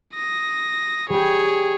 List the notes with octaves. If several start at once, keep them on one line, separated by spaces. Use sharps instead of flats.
D#6 A#6
G3 G4 G#4 C#5